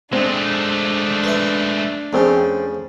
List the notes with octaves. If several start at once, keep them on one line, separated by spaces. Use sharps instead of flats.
G#3 A3 C4 D4
B4 E5
F2 C#3 A3 C4 C#4